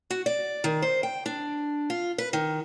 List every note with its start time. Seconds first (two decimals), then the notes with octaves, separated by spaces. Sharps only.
0.10 F#4
0.26 D5
0.64 D#3
0.82 C5
1.03 G5
1.26 D4
1.90 F4
2.18 B4
2.33 D#3